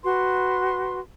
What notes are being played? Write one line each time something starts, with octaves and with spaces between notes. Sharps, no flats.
F#4 B4 C6